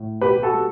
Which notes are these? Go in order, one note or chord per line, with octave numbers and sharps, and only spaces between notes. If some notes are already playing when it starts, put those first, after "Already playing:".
Already playing: A2
B2 G4 B4
G4
F#4 A4
G3